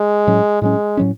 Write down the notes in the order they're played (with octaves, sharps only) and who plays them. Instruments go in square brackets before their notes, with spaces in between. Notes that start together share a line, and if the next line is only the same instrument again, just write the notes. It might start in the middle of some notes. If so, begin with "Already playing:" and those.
Already playing: [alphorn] G#3
[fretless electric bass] A2 F#3 C#4
[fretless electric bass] A2 F#3 C#4 [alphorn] G#3
[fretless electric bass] A2 F#3 C#4